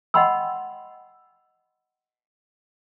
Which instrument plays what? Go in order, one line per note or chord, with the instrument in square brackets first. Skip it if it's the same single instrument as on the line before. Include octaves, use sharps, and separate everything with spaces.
[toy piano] D#5 F#5 G5 B5 C6 E6